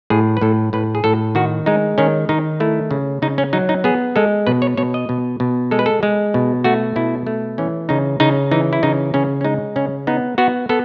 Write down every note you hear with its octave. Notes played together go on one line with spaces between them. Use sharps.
A2 G#4
B4
A2 A4
A2 B4
G#4
A2 A4
D#3 F#4
G#3 D#4
D#3 C#4
D#3 D#4
A3 E4
C#3
C#3 D#4
C#4
F#3 D#4
D#4
B3 G#4
G#3 A4
B2 B4
C#5
B2 C#5
D#5
B2
B2
G#3 A4
B4
A4
G#3
B2
A3 F#4
B2 E4
A3
E3 C#4
C#3 D#4
C#3 D#4
E3 D#4
E4
C#3 D#4
C#3 C#4
C#4
G#3 D#4
C#3 C#4
B3 D#4
B3 F#4
B3 A4